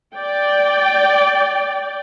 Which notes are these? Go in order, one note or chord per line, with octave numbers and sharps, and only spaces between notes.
D5 G5